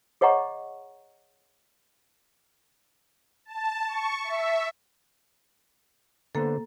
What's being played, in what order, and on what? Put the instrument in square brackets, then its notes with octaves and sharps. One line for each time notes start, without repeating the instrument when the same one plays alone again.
[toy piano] G#4 C#5 D#5 F#5 A#5 C#6
[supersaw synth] A5
C#6
E5
[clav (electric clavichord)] D3 B3 C5 [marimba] A#3 A4